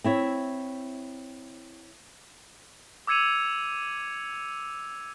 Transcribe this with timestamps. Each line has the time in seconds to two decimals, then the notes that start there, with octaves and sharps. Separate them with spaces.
0.04 C4 E4 C#5
3.07 D6 E6 G#6 C#7 D#7 F7